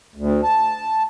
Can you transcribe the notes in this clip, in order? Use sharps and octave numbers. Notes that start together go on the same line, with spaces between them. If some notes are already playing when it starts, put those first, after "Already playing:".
D2
A5